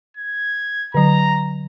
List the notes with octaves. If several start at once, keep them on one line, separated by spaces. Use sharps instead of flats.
G#6
D3 F#3 A#5